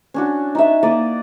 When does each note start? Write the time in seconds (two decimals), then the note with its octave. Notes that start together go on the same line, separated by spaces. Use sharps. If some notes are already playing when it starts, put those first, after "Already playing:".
0.14 C#4 D4 F#4
0.55 D#4 E5
0.83 A#3 D5 D#5